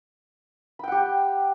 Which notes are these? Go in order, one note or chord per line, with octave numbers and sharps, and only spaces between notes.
G4 F#5 G5 B5